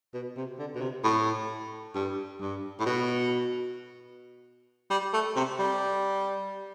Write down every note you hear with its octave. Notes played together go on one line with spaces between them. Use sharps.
B2
C3
D3
B2
C3
A2
G2
G2
A2
B2
G3
A3
C3
G3